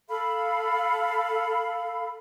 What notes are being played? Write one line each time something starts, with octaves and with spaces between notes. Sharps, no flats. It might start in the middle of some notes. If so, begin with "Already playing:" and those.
A4 F5 B5